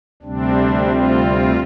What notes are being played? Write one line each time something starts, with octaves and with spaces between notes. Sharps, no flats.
D2 C3 G3 C4 D4
F4